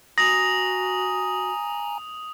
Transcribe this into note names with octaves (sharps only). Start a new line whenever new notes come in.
F#4 G#5 A#5 D#6 A#6 F7